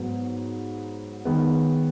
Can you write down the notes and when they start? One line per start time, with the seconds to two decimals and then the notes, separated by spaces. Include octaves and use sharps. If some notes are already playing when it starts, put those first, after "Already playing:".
Already playing: G#2 F#3 B3
1.25 D#3 G#3 B3